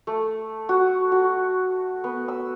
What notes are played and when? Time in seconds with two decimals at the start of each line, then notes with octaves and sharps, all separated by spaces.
0.07 A3
0.69 F#4
1.12 F#4
2.04 B3
2.28 E6